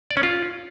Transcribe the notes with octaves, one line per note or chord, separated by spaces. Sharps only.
D5
C#4
F4